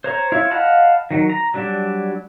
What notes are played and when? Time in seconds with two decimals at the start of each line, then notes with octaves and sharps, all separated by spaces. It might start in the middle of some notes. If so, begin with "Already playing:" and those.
0.04 C5 C#5 A#5
0.32 E4 F4 C#5
0.51 D#5 F5 F#5 A5 B5
1.11 D#3 F#3
1.30 A#5
1.54 F#3 G3 D4